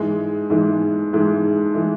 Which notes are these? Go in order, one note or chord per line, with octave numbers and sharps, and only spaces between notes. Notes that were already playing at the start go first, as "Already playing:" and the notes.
Already playing: G#2 E3 G#3
G#2 E3 G#3
G#2 E3 G#3
E3 G#3